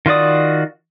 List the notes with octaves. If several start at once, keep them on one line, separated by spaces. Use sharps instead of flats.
D#3 F4 F#4 D5 D#6